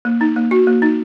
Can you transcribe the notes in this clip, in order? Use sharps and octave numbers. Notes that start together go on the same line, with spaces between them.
A#3
D#4
A#3
F#4
A#3
D#4